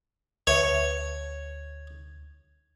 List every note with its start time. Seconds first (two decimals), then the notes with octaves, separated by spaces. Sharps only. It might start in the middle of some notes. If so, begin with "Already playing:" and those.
0.47 D2 B4 C#5 E5